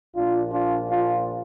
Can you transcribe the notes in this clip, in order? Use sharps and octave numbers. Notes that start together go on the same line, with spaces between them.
A#1 A#2 D4 F4
D4 F4
D4 F4